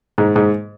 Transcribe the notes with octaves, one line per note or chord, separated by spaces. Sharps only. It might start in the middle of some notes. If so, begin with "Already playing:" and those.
G#2
G#2